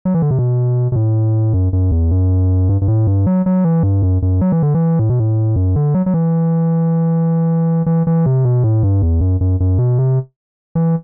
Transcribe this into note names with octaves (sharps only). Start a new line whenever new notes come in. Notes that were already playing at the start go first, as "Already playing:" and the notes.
F#3
E3
D3
C3
B2
B2
A2
F#2
F#2
E2
F#2
G2
G2
A2
G2
F#3
F#3
E3
G2
F#2
F#2
F#3
E3
D3
E3
A2
B2
A2
F#2
D3
F#3
F#3
E3
E3
E3
C3
B2
A2
G2
E2
F#2
F#2
F#2
B2
C3
E3